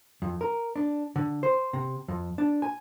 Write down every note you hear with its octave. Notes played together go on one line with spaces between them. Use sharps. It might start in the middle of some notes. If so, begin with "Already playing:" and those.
F2
A#4
D4
D3
C5
C3
F2
D4
G#5